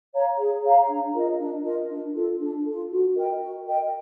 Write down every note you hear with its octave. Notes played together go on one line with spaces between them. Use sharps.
C#5 F5 A#5
G#4
C#5 F5 A#5
D4
F4 A#4 D#5
D4
F4 A#4 D#5
D4
F4 A4
D4
F4 A4
F#4
A#4 D#5 G5
F#4
A#4 D#5 G5